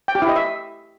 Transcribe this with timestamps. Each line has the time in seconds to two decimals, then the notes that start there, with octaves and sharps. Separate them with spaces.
0.08 G5
0.15 G4
0.22 E4
0.29 D#5
0.36 E5